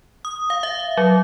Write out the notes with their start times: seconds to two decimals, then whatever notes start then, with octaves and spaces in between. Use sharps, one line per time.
0.25 D#6
0.50 F5
0.63 E5
0.97 F#3